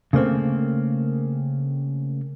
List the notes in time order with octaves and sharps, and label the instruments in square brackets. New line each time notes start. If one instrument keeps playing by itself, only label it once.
[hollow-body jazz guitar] C#3 A3 A#3 C4